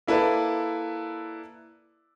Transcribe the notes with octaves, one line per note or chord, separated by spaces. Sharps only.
A#3 E4 A4 B4 D5 A5